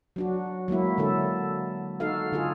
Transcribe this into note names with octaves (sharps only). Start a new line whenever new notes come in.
F#3 D4 F#4
F#3 G#3 A#3 E4
D3 E4 A4
D#4 F#4 A4 F5
D3 F4 G#4